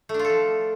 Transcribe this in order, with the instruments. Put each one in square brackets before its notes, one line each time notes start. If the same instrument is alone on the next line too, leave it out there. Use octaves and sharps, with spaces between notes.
[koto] A3
D4
F4
A4
F3